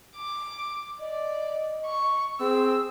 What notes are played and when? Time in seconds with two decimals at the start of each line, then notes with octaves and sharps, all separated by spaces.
0.16 D6
1.00 D5 D#5
1.86 C#6
2.40 C4 G#4 E6